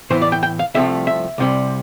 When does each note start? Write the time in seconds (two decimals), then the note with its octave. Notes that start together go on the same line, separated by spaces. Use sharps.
0.10 A2 E3 B3 C5
0.22 D5
0.32 G5
0.43 G5
0.59 F5
0.74 C2 C3 F3 A3 E5
1.07 E5
1.38 C2 C3 G3